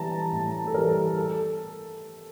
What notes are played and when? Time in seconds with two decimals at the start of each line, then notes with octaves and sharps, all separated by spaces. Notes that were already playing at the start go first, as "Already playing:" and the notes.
Already playing: E3 G3 A5 A#5
0.32 A2
0.67 A4
0.74 E3 G3 A#4
1.17 A4